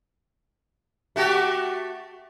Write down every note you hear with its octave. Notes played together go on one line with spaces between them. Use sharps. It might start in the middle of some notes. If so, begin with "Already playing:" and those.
A3 F#4 G4